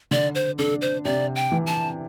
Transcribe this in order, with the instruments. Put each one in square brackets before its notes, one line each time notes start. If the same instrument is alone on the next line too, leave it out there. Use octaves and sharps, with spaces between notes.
[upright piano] D3 [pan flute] D5
[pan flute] C5
[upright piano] D4 [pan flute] A4
[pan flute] C5
[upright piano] C3 [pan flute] D5
[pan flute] G5
[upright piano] E3
[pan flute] A5